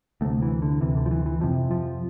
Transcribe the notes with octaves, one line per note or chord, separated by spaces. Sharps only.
D2 C3 A3
E3
D3
D2 C3 E3
D3
F3
E3
E3
F2 C3 F3
F3